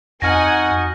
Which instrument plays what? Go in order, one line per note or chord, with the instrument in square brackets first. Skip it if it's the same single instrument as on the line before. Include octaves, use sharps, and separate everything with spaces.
[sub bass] F2 [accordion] D#4 F#4 [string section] F#5 G#5 [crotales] F6 A#6